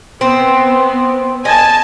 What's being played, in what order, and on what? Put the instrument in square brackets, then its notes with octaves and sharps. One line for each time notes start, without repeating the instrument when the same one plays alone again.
[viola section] B3 [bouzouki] C4
[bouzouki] D#5 [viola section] G#5 A5